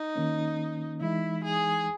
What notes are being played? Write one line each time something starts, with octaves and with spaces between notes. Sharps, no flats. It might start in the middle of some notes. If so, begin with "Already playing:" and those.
Already playing: D#4
D#3 A#3 C#4
E3 G#3 D#4 E4
G#4